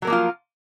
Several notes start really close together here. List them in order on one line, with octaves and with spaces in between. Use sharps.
F#3 A#4 A#3 F3 F4